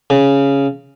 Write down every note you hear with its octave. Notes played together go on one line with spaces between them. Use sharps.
C#3